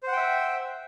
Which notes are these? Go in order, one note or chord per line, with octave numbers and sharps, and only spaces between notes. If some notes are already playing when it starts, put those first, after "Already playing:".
C5 E5 F#5 G5